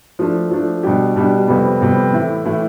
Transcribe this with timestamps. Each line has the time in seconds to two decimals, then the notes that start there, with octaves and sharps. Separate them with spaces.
0.19 F3 A3 D4
0.51 F3 A3 D4
0.83 B2 G3 D4 G4
1.16 B2 G3 D4 G4
1.48 F2 C3 G3 B3
1.81 F2 C3 G3 B3
2.13 A2 E3 A3 E4
2.45 A2 E3 A3 E4